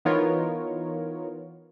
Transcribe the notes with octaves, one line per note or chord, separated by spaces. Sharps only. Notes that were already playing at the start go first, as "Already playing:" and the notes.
E3 B3 D#4 F4 A#4 C#5